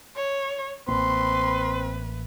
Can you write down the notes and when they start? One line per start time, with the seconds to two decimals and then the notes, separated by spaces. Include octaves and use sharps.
0.16 C#5
0.88 A1 A#3 C4 B4 C6